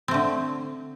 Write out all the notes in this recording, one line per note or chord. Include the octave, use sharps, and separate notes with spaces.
D3 A3 C4